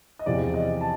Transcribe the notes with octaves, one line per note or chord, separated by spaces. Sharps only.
D#5
E2 C3 F3 D5
D#5
A5